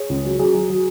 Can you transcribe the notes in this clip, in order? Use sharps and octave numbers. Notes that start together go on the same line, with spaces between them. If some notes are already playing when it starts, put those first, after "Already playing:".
Already playing: G#4 C#5
C#2
F#3
F#3 G#4
F#3
F#3